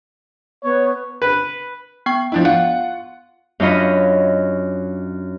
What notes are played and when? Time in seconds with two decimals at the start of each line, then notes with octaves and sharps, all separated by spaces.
0.64 B3 C#5
1.22 B4
2.06 B3 G5 C#6
2.32 F3 D4 E4
2.45 F4 F#5
3.60 F#2 D4 F4 C#5 D#5 B5